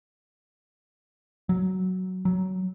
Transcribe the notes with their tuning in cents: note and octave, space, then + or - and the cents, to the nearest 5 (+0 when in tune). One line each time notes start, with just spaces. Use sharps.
F#3 +5
F#3 +15